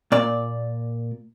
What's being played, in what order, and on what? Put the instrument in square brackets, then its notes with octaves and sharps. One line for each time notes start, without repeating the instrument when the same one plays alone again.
[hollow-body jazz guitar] A#2 D5